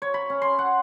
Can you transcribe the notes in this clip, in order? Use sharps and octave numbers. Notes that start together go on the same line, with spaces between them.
C#5
B5
C#4
C6
F#5